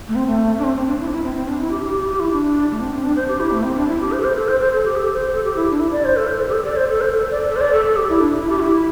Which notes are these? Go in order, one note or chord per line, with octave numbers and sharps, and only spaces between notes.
A3
C4
A3
D4
C4
C4
D4
E4
D4
E4
C4
C4
D4
E4
G4
G4
G4
G4
E4
D4
A3
C4
C4
D4
C5
G4
E4
A3
C4
D4
E4
G4
C5
A4
C5
A4
C5
C5
A4
G4
A4
C5
A4
G4
E4
D4
E4
D5
C5
A4
C5
A4
G4
A4
D5
C5
A4
C5
A4
D5
A4
C5
D5
A4
A4
G4
E4
D4
E4
G4
E4